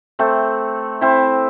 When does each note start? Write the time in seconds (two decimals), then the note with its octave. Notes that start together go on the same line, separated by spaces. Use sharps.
0.19 A3 C4
1.01 C4 E4